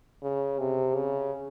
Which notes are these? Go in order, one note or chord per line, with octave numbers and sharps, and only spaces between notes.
C#3
C3
C#3